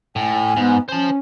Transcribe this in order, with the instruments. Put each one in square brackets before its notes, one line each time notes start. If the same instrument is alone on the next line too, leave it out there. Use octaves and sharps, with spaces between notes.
[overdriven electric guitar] A2 [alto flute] G#5
[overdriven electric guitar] G#2 [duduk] B3
[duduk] C#4 [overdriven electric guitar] C5 A5 [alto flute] G#5